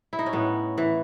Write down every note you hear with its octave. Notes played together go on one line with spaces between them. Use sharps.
E4
D#4
C#4
A2 B3
E3